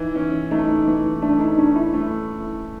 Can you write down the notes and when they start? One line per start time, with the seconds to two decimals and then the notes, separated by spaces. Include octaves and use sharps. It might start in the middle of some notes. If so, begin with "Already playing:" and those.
Already playing: E3 D#4
0.15 C#4
0.51 A3 D#4
0.87 E3
1.22 A3 D4
1.40 D#4
1.58 C#4 D4
1.76 E4
1.94 A3